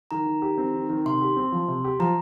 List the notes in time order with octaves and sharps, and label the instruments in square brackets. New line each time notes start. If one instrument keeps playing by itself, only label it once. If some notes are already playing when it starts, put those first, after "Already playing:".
[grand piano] D#3 [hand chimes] A#5
[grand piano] D#3
G4
C4
D#3
D#3
[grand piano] C3 [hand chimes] C6
[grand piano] G4
C4
F3
C3
G4
[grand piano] F3 [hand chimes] A#5